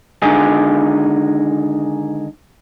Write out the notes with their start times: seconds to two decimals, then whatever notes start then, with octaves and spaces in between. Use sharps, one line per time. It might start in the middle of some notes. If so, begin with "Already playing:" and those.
0.22 D3 D#3 G#3 D#4 G#4